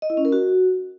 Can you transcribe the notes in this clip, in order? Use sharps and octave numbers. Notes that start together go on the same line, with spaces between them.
D#5
E4
C#4
A#4
F#4